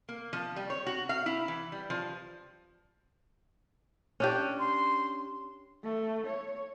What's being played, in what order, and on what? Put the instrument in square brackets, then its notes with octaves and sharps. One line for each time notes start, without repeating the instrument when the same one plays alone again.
[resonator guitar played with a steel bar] A#3
F3
G3
C#5
F#4
F5
E4
E3
G3
F3
[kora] C#4 D4 G4
[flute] C6
[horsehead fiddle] A3
C#5